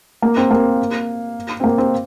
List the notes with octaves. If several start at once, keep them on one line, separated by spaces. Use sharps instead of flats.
A#3
C4
A#3
C4
A#3
C4